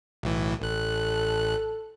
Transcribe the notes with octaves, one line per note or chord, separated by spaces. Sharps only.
B1 A2 E3
A1 A4 F#6